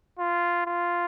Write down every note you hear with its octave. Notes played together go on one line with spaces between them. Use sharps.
F4
F4